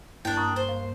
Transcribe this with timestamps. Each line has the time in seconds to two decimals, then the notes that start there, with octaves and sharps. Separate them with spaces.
0.25 G2 A#3 D4 E4 G5
0.37 A#5 C#6 D#6
0.56 C5
0.69 F5